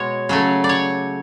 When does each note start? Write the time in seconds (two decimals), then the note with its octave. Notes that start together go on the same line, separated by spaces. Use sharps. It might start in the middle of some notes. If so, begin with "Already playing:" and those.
Already playing: B2 G#3 C#5
0.29 C#3 F#3 A3
0.64 D5
0.69 C#5